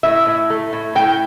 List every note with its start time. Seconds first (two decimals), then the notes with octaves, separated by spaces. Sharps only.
0.03 A2 E5
0.27 A2
0.50 A3
0.73 A2
0.95 A2 G5